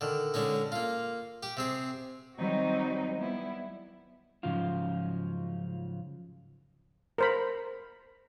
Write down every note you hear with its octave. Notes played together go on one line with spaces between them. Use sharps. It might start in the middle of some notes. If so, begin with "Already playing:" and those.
D3 D#3
D3 G#3 C#4 D#4
A#3 F4
G4
C3 C4 G#4
D#3 F#3 G3 C4 D#4 F#4
G3 B3 E4
G#2 C#3 F3 F#3 F4
A#4 C5 B5